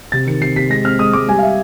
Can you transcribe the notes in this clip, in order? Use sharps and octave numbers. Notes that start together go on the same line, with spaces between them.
C3 A6
D#3 C#7
C3 C7
C3 B6
G#3 A#6
C4 F6
G#3 D#6
G#3 D6
G3 G#5
F5
E5